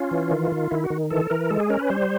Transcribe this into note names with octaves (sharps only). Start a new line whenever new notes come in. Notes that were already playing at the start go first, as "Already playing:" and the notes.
Already playing: C#4 F4
E3
D#3
D#3
D#3 E4
F#4
D#3
E3 A4
E3 A#4
G#3 A4
G#4
C#4 A#4
B4
G3 C5